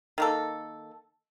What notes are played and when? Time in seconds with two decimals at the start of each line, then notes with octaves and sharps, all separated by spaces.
0.18 D#3 A#3 A4